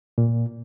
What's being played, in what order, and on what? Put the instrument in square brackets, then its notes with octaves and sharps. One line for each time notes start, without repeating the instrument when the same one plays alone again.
[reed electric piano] A#2